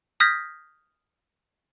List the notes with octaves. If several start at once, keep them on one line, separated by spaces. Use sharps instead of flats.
D#6 F6 G6 G#6 A#6 B6